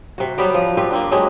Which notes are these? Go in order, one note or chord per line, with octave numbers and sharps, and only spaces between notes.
C3 F#4
F#3 G3 B3 G4
F3
C4 F4 G4 B4
A#3 C4 D4
F#3 G#3 D4 G4